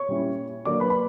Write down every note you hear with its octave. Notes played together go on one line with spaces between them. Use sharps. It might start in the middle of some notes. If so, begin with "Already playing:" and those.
Already playing: C#5 C#6
A#2 G3 C#4 E4
D3 F#3 A#3 D5 D6
B4 B5
B5